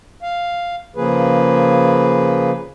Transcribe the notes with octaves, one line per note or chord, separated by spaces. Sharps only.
F5
C#3 F3 A#3 G#4 B4